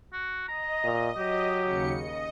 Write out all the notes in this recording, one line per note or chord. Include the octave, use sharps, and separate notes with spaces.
F#4
D#5 A#5
A#2
F#3 G4
D#2 C#3 C#7
D#5